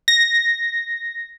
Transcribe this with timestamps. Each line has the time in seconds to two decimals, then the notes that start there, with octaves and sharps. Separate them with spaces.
0.08 A#6